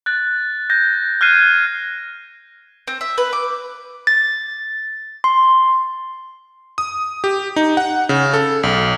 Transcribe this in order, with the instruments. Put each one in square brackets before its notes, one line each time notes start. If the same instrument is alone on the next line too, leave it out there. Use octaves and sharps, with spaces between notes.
[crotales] F#6 A6
G6 A#6
F6 F#6 G#6 C7 D#7
[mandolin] C4
E5
B4
D6
[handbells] A6
C6
[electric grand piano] D#6
G4
D#4
F#5
C#3
A4
B1